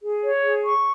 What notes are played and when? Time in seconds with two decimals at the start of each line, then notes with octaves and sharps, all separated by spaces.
0.03 G#4
0.23 C#5
0.44 G#4
0.63 C#6